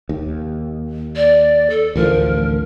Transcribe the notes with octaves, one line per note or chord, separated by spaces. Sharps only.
D#2
D5
A4
A1 D2 F3 A#4